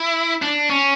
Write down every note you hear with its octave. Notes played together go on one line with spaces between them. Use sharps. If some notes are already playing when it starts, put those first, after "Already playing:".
Already playing: E4
D4
C#4